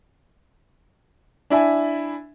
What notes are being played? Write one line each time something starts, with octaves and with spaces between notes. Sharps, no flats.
D4 E4 E5 G#5